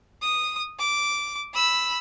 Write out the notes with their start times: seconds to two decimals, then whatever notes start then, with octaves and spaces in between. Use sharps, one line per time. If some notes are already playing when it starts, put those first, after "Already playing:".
0.22 D#6
0.79 D6
1.53 B5 E6